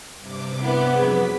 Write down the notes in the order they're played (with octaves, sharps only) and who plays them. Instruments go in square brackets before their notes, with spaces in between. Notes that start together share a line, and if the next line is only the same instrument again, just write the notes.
[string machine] G2 C3 D6
[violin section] B3 [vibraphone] E4 E5
[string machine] F2 F#3 B6 [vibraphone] G#4